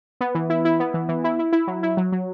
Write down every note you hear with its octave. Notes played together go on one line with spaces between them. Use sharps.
B3
E3
E4
E4
B3
E3
E3
E4
E4
E4
F#3
E4
F#3
F#3